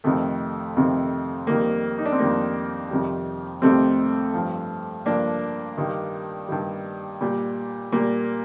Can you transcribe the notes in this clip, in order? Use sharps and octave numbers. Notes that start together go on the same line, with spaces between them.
F2 C3 D#3 A3
F2 C3 D#3
F2 D#3 G3 A#3
D#4
D4
C4
F2 D#3 G3 A#3
F2 C3 D#3 G3
F2 C3 D#3 G3 A3 C4
G2 F3
G2 F3 A#3 D4
G2 D#3 G3
G2 D#3 G3
A#2 G3
A#2 G3 A#3